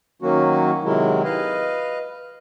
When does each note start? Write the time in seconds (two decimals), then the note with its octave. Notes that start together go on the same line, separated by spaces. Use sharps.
0.22 D#3 F#3 A#3 C#4 F#4
0.84 C3 D#3 F#3 G#3 E4
1.24 B4 D#5 F5